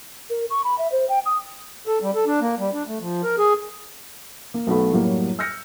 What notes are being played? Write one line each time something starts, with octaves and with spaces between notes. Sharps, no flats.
A#4
C#6
B5
E5
C5
G5
D#6
A4
G3
A4
D4
A#3
G3
D4
A3
F3
A#4
G#4
A#3
B1 A3 B3 F#4 A4 B5
F#2 A2 F#3 G3 A#3
E6 F6 G6 A#6 C#7